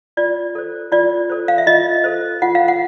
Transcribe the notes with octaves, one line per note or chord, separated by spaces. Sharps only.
F4 D5
A4 C5
F4 D5
A4 C5
F5
E5
F4 D#5
A4 C5
F4 F#5
F5
F#5